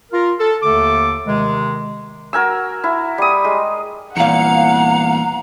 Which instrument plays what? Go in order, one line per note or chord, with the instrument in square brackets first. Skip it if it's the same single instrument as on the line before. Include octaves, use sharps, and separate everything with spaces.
[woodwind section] F4 A#4
A4
D#2 D3 A3 A4 D6
C3 D#3 G#3
[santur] F#4 A#4 G#5 E6
E4
G3 D#6
G#3
[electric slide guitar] E2 A#2 [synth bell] F5 C#7 [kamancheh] F#5 [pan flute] A#5